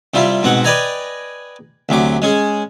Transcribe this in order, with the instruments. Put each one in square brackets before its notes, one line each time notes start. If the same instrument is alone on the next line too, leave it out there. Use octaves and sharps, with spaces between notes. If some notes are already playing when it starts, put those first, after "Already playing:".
[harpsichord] C3 G3 E4 F4
G#2 B2 C4 F#5
B4 D5 D#5 G5 G#5 A#5
D2 C3 F#3 D6
G#3 C#4 G#4